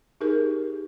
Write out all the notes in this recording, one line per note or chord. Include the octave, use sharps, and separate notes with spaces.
D#4 G4 G#4 A#4